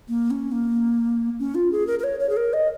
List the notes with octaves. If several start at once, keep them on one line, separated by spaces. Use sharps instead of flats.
A#3
C#4
A#3
C#4
F4
G#4
A#4
A#4
C#5
C#5
G#4
A#4
D#5